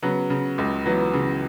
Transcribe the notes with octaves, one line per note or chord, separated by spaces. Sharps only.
C#3 F#3 B3
C#3
C#2
E3 F#3 B3
C#3